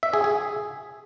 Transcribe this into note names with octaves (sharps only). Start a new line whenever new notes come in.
E5
G#4
G#4